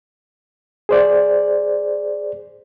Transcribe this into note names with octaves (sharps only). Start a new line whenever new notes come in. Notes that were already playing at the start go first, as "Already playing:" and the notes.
G#4 C5 D5